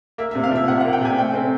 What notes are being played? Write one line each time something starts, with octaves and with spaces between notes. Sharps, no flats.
A#3 E5
E5
C3
F5
F3 E5
C3 F#5
F#5
A#3
G5
C3 G#5
A3 G5
C4